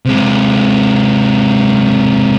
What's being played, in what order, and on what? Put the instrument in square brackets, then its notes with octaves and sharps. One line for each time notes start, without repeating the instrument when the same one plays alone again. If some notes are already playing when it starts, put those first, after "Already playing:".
[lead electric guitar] C3 G#3